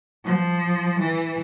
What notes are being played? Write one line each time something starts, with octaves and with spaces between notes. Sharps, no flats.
F3
E3